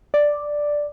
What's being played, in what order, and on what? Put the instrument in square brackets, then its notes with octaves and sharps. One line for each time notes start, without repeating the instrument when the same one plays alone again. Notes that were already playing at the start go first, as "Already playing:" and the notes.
[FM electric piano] D5